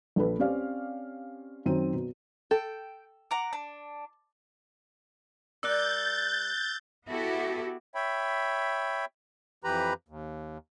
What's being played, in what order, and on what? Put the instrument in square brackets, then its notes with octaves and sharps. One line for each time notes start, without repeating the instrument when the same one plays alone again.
[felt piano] A#1 A4 B4
C4 C#4 G4 D5 F5
F#2 D#3 C4 D#7
B2
[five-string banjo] A4 [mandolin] G5
[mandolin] F#5 A#5 D6
D4
[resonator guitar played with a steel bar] G3 A#4 D5 [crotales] E6 F#6 [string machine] G6 A6
[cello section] B3 E4 F#4 G4 A4
[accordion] C#5 E5 G5 B5
F2 E3 G4 B4 A#5 B5
D#2